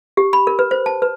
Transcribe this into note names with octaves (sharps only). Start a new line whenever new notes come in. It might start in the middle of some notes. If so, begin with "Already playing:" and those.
G4
B5
A#4
B4
C5
A5
B4